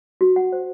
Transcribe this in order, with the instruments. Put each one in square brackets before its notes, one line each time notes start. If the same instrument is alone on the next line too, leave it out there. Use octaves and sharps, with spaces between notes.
[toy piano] F#4
F#5
C5